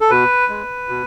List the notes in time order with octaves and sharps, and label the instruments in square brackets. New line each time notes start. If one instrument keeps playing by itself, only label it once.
[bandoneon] A4
B2 B4
G#3
B2